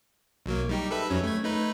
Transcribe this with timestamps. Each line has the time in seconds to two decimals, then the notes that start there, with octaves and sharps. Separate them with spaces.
0.46 B1 F#3 A#3
0.69 G3 D#4 G4
0.91 A4 B4 E5
1.10 F2 F#3 C#4
1.23 A3 G#6
1.44 A3 D#4 B4